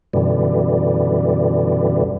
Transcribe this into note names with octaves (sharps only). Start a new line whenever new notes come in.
F#2 B2 D3 E3 G3